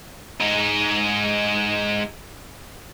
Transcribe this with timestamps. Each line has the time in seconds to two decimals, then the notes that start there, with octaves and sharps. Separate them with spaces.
0.40 G#3 D#4